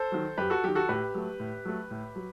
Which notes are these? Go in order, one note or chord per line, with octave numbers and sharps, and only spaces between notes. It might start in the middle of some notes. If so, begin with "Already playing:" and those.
Already playing: A4 C5
D#3 F#3
F#2 G4 B4
F#4 A4
D#3 F#3 G4
F#4 A4
A2 G4 B4
F#3 A3
A2
F#3 A3
A2
F#3